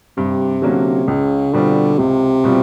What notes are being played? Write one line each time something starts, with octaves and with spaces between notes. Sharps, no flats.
G2 C3
D3 F#3 A#3 C#4
C#2 C#3
B2 D3 G3 C4 F4
C#2 C3
B2 G3 C4 F4